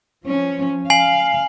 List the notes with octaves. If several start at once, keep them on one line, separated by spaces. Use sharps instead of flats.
F3 C#4
F5 G#5 C7 F#7